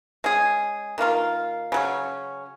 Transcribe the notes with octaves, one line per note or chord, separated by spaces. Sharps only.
G#3 C#4 G#4
D#3 A#3 F4 A#4
C#3 F#3 C#4